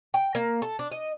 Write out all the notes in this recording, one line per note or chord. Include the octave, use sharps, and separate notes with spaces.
G5
A#3
A4
D4
D#5